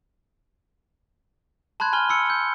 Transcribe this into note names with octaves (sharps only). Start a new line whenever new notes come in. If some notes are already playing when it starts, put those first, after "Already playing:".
A5 B5 C6 F#6 G#6
G#5 B5 F6 G7
B5 E6 C#7
G6